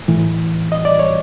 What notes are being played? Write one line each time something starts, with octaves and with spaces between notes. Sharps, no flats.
A2 E3
D#5
D5
C#5